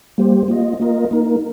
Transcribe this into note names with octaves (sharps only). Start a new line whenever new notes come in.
G3 A#3 G4 C5
A#3 F4 D#5
A#3 F4 A#4 D#5
A#3 D#4 A#4